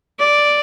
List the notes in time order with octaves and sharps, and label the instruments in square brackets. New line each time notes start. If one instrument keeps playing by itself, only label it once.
[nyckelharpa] D5